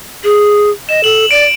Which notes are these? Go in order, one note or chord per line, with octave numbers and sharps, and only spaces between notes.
G#4
D#5 E7
A4 F#7
D5 D7